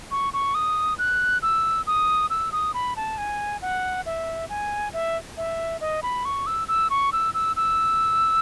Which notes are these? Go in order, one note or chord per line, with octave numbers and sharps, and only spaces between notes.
C#6
C#6
D#6
F#6
E6
D#6
E6
D#6
B5
A5
G#5
F#5
E5
G#5
E5
E5
D#5
B5
C#6
E6
E6
C#6
E6
E6
E6